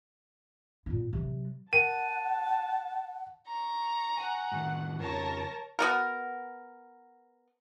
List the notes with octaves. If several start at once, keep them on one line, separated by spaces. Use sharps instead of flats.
A#2 B3
C3 F#3
A#4 F#5 G5 A5 D#7
A#5 C#6
F#5 G#5
A2 D#3
F2 C#3 A#4 C#5 A5 A#6
B3 F#4 A#4